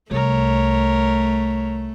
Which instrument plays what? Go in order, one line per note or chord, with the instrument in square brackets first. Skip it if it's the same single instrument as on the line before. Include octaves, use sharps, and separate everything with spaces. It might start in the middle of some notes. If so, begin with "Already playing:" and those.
[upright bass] C2 [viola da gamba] A3 [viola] A#4 C#5